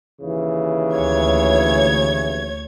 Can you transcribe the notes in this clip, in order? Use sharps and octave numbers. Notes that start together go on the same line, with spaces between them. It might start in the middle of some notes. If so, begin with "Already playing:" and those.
D#2 C#3 E3
D2 C#5 G#6